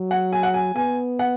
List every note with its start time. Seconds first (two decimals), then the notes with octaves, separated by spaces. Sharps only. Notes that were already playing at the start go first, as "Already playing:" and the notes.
Already playing: F#3
0.11 F#5
0.33 G#5
0.43 F#5
0.54 G#5
0.75 B3 G#5
1.19 F#5